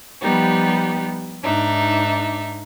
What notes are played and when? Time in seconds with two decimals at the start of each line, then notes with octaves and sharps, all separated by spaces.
0.22 F3 G3 B3 D#4 G4
1.43 G#2 D4 D#4 E5